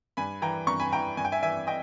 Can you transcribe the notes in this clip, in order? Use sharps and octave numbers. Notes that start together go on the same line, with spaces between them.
G2 G#5 B5
E3 G5 A#5
G2 A#5 C#6
G#5 B5
E3 G5 A#5
G2 G#5
G5
E5 G#5
E3 E5 G#5
D#5 G5